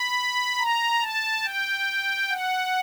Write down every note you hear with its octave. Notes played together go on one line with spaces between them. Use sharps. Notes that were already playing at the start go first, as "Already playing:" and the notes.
Already playing: B5
A#5
A5
G5
F#5